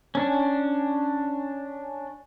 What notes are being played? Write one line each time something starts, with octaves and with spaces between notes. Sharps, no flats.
C#4 D4